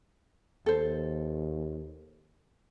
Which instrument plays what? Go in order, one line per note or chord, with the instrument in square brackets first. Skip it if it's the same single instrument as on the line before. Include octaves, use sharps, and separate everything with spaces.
[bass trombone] D#2 [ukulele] A4 C5